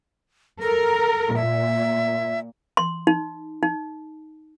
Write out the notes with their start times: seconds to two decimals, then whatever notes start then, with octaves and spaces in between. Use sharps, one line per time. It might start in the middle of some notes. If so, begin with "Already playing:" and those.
0.62 A4 A#4
1.35 A#2 E5
2.77 C6
3.07 D#4
3.63 D#4